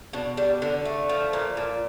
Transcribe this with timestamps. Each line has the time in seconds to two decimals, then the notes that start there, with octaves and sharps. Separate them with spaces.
0.13 B2 D4
0.37 G3 D4
0.62 D3 D4
0.85 A3
1.09 F3
1.33 A#2
1.57 A#2